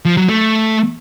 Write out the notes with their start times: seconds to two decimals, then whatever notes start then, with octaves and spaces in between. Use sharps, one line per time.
0.05 F3
0.17 F#3
0.29 A3